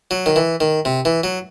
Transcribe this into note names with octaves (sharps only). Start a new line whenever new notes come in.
F#3
D#3
E3
D#3
C3
E3
F#3